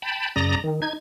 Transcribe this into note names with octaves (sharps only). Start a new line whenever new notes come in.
G5 A5 B5
F#2 C#3 D5 A#5 D#6 A#6
D#3
D#4 G#6